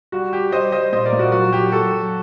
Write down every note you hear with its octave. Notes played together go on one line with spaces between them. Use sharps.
G3 F#4
G3 G4
G3 C5 D#5
G3 C5 D#5
A#2 C5 D#5
A#4 D5
A#2
F#4
F#3 F#4
F#3 G4
F#3 F#4 A4
F#3